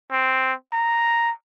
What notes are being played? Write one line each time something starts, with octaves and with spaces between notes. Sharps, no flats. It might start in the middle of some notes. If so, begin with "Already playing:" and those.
C4
A#5